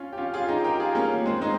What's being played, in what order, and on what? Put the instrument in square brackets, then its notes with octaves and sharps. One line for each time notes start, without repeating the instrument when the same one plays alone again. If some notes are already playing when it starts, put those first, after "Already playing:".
Already playing: [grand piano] C#4 F4
G4
C#4 F4
F4 G#4
D#4 G4
G4 A#4
F4 G#4
A#3 C#4
G#3 C4
C4 D#4